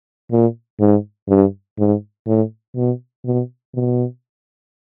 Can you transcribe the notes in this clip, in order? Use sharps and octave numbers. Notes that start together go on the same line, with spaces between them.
A#2
G#2
G2
G#2
A2
B2
B2
B2